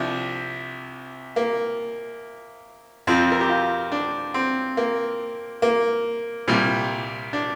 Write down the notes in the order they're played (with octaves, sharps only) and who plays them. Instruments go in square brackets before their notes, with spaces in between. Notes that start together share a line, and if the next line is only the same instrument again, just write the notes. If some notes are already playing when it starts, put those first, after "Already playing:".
Already playing: [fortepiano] C2 C3 F3 D4
A#3
F2 F3 C4
A#4
G4
F4
D4
C4
A#3
A#3
C2 A#2 G3
D4